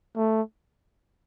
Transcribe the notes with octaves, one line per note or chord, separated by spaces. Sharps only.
A3